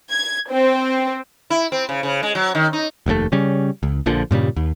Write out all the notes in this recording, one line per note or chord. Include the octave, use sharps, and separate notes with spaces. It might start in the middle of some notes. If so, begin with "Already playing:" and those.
G#6
C4
E4
C4
C#3
C#3
G#3
F#3
D#3
D#4
F1 D#2 B2 A3
C#3 G3 C#4
C#2
A#1 A#2 D3 F3
G2 A#2 C#3 G3
D#2